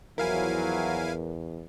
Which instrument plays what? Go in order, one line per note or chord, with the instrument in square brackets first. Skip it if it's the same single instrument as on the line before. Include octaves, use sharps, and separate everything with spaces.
[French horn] E2 [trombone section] F3 F#3 [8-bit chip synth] E4 F5 G#5 [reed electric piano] A#4